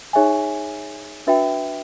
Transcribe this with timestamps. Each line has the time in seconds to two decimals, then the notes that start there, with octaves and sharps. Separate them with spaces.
0.13 D#4 G#4 C#5 E5 G#5
1.27 D4 F#4 B4 E5 G5